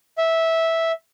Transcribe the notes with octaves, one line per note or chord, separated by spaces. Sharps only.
E5